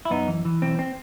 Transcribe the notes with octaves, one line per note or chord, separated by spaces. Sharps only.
E4
F#2 B3 D#4
E3
E3
B1 C4
C4